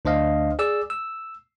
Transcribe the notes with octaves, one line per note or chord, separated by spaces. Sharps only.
D2 D4 C5 D#5 F5
G#4 D5 E6
E6